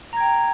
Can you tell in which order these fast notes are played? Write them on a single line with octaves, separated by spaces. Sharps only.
A#5 G#6 G5